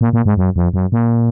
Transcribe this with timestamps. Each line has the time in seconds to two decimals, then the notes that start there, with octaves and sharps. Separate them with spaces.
0.01 A#2
0.13 A#2
0.26 G#2
0.37 F#2
0.56 F2
0.74 F#2
0.92 A#2